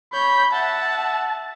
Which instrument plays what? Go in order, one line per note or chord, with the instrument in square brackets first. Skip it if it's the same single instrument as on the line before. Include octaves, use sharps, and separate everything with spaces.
[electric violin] C#5 G6 [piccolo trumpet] B5
[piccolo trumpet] E5 [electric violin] F#5 [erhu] A5